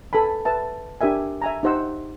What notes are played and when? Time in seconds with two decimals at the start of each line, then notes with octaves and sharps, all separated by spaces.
0.13 A4 B4 G#5 B5
0.45 B4 E5 A5
1.01 D4 G4 A#4 E5 G#5
1.42 E5 G#5 A#5
1.63 D#4 G4 C5 F#5 E6